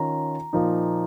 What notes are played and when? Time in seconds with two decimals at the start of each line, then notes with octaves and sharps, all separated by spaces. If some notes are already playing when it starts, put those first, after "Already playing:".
Already playing: D#3 C#4 F4 A#5
0.53 A#2 F3 A#3 D#4